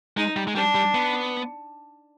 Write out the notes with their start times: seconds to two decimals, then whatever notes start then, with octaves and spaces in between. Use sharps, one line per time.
0.17 G#3 D#4
0.36 G3
0.48 G#3
0.55 G3 D4
0.75 G3
0.95 B3